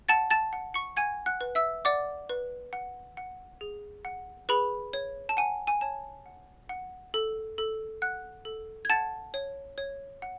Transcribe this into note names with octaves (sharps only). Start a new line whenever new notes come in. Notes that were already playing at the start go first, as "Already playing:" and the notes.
F#5 A5 A6
A5 A6
F#5
C#6 C#7
F#5 G#5 G#6
F#5 F#6
B4
E5 E6
D5 F#5 D6
B4
F#5
F#5
G#4
F#5
G#4 B4 B5
C#5
A5
F#5 G#5
G#5
C#5 A5
F#5
F#5
A4
A4
F#5 F#6
A4
G#6
F#5 A5 A6
C#5
C#5
F#5